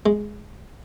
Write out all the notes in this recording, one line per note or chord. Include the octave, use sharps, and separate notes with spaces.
G#3